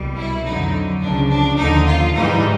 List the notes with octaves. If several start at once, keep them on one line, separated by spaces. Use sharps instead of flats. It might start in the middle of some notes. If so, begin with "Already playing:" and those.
Already playing: C2 B2 G3
E4
F2 D3 F#3 D#4
C#2 C#3 F3 D4
D4
D#2 D3 F3 D#4
F4
G#2 E3 G3 D#4